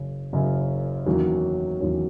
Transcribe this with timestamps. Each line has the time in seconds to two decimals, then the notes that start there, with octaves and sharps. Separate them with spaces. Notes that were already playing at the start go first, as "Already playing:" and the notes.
Already playing: F#1 F#2 C#3
0.33 F#1 F#2 C#3
1.06 E2 D#3 F#3 A#3 C#4
1.80 E2 D#3 F#3 A#3 C#4